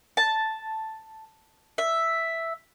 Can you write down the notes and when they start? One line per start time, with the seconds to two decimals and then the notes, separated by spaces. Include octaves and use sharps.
0.17 A5
1.78 E5